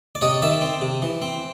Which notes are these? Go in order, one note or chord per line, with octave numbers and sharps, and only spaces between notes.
D5
C3 C#5 D#5
D#3 D5 E5
C4
C3
E3
C4